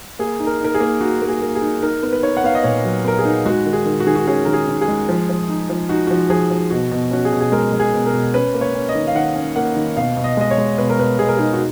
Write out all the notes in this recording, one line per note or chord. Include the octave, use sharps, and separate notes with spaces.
A#3 G#4
D#4
A#4
D#4 A#4
G#4
A#3
D#4 F#4
A#3
G#4
A#3
G#4
D#4
D#4 A#4
B3
B4
D#4 C#5
F#5
B3 F5
D#5
A#2 C#5
F#3
B3 A#4
G#4
D#4
G#3 F#4
D#3
G#4
D#3
F#4
D#3 G#4
F#4
C#4 G#4
D#3 A#4
G#4
D#3
G#4
G#3
F3
F3
D#4
F3
D#4 F#4
F3 F#4
F3 G#4
F3
B2 F#4
B2
C#4 F#4
G#4
B2
G#4
G#3 A#4
G#3
G#4
B2
A#4
B2
C#4 B4
A#3
C#5
C#4
D#5
D#3
F5
D#3 F#5
C#4
A#3 F#5
D#3
B2 F5
B2
D#5
G#3 D#5
C#5
G#3
B2 B4
A#4
B2 B4
B2 G#4
A#4
D#4 G#4
F#4